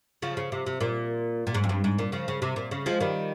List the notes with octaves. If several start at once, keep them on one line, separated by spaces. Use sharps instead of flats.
C#3 F3
C#3
C3
C3
A#2
A#2
G#2
F2
G2
G#2
A#2
C#3 F3
C#3
C3
A#2
C#3
F3 G#3
D#3 G3